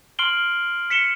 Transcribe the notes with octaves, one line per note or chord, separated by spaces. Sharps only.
C6 F6 C7 D7 F#7 G7
B6 C#7 E7 G7